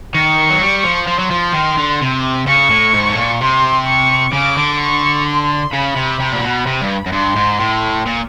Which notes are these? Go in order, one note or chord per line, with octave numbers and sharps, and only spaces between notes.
D#3 C#6
F#3
G3
F3
F3 C6
F#3
F3
D#3
D3
C3
C#3 C#6
A2
G#2
A2
A#2
C3 C6
C#6
C#3 D6
D3
C#6
C6
C#3 B5
C3
C3
A#2
B2
C3
G2
F#2
G2 C6
G#2
A2
A#2